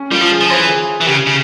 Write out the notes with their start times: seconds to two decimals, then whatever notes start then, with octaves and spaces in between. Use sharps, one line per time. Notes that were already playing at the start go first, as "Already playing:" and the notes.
Already playing: C#4
0.11 G3 F4
0.21 F3
0.31 G#4
0.41 F3
0.50 E3 C5
0.68 G#4
1.01 E3
1.07 C#3 G4
1.27 C#3